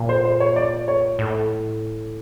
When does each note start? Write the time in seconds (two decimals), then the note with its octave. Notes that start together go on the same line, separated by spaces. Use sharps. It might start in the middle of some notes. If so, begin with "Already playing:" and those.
Already playing: A#2
0.09 C5
0.25 C5
0.40 C#5
0.56 D5
0.88 C#5
1.19 A2